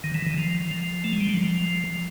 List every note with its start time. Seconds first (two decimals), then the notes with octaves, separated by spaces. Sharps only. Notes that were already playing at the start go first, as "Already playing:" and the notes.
0.04 D#3
0.15 E3
0.27 D#3
0.38 F3
0.71 F3
1.04 A3
1.13 G#3
1.20 G3
1.29 F#3
1.37 F3